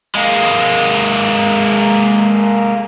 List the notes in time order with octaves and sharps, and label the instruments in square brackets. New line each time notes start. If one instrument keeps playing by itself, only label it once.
[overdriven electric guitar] G#3 A#3